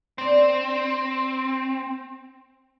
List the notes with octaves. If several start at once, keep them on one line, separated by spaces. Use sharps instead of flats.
C4 D4 D5